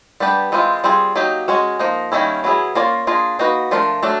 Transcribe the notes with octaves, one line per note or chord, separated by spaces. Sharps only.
G3 B3 D4 G4 B4
E3 G#3 C4 F4
G3 C4 F4 G#4
F#3 A#3 D#4 G4
G#3 C#4 F#4
F3 A#3 D#4
D#3 G3 A#3 C#4 E4
F#3 B3 E4 G#4
A#3 C#4 F4 A#4 D5
A#3 D4 F4 G#4
A#3 D#4 F#4 B4
F3 A3 D4 F4 A#4
F#3 A3 D4